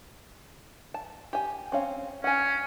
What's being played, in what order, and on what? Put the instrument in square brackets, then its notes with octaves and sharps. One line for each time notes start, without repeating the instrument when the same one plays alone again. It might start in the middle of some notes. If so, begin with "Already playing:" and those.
[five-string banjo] A5
G4 G#5
C4 C#4 F5
[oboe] C#4 [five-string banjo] F#5 G#5